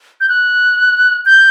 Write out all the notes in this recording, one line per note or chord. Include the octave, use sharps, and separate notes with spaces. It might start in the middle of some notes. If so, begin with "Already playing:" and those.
G6
F#6
G6